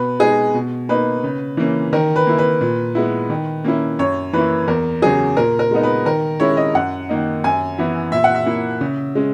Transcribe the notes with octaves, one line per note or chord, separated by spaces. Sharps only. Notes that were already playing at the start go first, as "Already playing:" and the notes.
Already playing: B2 B4
G#3 D#4 G#4
B2
A#3 D#4 B4
C#3
E3 A#3 C#4
D#3 A#4
B4
A#3 E4
B4
A#2
G#3 B3 E4
D#3
A#3 C#4 E4
F#2 C#5
E3 A#3 E4 B4
E2 A#4
C#3 F#3 G#4
A#2 A#4
A#4
G#3 B3 D#4
B4
D#3 A#4
G#3 C#4 E4 C#5
D#5
F#2 F#5
D#3 A#3 D#4
F#2 G#5
E3 B3 E4
A#2 E5
F#5
E5
A#3 E4
C#3
G#3 C#4